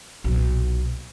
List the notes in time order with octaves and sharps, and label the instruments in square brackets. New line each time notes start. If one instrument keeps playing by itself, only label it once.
[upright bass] B1 A#2